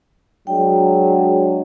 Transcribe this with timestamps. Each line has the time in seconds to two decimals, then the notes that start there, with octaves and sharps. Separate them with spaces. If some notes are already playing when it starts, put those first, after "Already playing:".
0.47 F#3 G#3 D4 G5